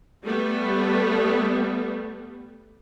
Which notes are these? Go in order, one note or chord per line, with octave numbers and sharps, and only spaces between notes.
G3 A3 B3